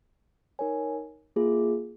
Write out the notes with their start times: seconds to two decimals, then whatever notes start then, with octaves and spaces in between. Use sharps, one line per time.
0.59 D#4 A#4 C#5 G#5
1.36 A#3 F4 G#4